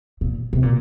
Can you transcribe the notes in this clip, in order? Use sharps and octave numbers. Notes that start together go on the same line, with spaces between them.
A#2
C3
A#2